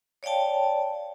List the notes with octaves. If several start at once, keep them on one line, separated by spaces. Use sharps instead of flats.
C#5 D5 F5 G5 A5